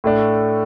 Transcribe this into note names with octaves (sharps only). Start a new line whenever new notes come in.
A2 A3 D4